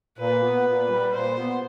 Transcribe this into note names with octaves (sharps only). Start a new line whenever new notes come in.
A#2 B4
B3
A#2
G3
A#2 C5
B3